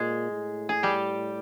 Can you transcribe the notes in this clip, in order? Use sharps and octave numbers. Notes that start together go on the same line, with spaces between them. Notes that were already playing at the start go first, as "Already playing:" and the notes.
Already playing: A#2 G#3 G#4
A2
G#4
G3 G4